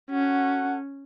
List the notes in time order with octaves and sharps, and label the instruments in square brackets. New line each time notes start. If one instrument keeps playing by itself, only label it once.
[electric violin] C#4 [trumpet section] F#4 A4 F#5